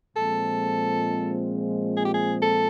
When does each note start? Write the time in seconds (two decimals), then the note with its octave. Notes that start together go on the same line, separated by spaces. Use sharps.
0.17 A#2 F3 G#3 C4 A4
1.97 G#4
2.05 G4
2.14 G#4
2.42 A4